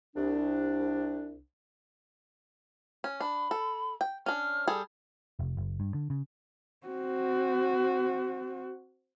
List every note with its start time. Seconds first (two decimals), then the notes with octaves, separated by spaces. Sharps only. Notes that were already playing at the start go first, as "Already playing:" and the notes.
0.16 C2 D4
3.04 C#4
3.20 D4 B5
3.51 A4
4.01 G5
4.26 C#4 D4 F6
4.68 G3 G#4 A4
5.39 F1
5.57 F#1
5.80 G2
5.94 D3
6.10 C#3
6.87 C4 F#4